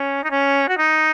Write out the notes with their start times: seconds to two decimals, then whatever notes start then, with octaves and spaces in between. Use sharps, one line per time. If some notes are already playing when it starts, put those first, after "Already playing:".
Already playing: C#4
0.24 D#4
0.31 C#4
0.68 F#4
0.77 D#4